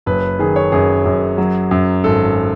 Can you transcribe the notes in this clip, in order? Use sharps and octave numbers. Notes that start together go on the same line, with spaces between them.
F#1 B4
D#3 G#4
C#5
F#2 G#4
F#2
F#3
F#2
G#1 A4